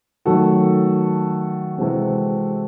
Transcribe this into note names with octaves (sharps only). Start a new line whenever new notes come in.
D#3 F#3 A3 F#4 A4
C3 E3 G#3 C4